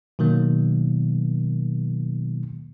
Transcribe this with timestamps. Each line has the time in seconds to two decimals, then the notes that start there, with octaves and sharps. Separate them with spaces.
0.19 B2 D#3 F#3 A#3